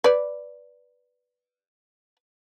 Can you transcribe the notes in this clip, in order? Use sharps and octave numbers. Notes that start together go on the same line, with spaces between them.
B4 D5